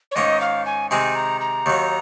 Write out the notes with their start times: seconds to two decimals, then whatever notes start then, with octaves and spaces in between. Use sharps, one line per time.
0.11 C#5
0.15 G#2 D#3 A#3 C#4 D#5
0.41 F5
0.65 G#5
0.91 C3 D#3 G#3 C4 D#4 G#5
1.15 A#5
1.41 A#5
1.66 D#2 D#3 F#3